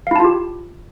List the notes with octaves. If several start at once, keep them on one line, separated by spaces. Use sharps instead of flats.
E4 F4 G4 F5 A5